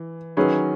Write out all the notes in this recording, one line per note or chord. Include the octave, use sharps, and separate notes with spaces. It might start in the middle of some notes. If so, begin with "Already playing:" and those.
Already playing: E3
D#3 F#3 C#4 G#4 B4